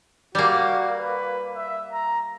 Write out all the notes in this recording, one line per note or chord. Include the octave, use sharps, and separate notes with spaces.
G3 A#3 F#4
B4
E5
A#5